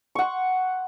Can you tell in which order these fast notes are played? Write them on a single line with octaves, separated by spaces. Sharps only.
C#6 F#5 C6